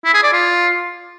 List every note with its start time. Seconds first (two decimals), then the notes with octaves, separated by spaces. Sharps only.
0.04 E4
0.14 G#4
0.23 D5
0.33 F4